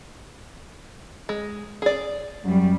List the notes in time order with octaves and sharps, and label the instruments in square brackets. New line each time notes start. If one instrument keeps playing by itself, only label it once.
[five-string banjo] G#3
G#4 D5
[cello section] F#2 G3